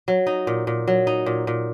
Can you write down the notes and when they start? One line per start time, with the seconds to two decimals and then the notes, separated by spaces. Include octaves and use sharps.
0.08 F#3
0.27 D#4
0.47 A#2
0.67 A#2
0.88 F#3
1.07 D#4
1.26 A#2
1.47 A#2